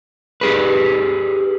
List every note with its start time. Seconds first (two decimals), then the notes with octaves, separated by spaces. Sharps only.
0.41 G4 G#4 B4